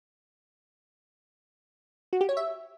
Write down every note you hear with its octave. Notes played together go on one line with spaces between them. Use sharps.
F#4
G4
C#5
E5